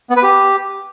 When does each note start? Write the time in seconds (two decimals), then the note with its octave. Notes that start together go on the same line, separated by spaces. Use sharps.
0.10 B3
0.16 B4
0.23 G4